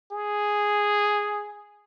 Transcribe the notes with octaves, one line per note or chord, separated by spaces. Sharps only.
G#4